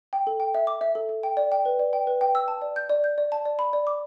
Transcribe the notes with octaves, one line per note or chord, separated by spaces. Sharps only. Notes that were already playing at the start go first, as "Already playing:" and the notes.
G5
A4
G5
E5
D6
E5
A4
A4
G5
D5
G5
B4
D5
G5
B4
G5
E6
A5
D5
G6
D5
G6
D5
A5
D5
B5
D5
D6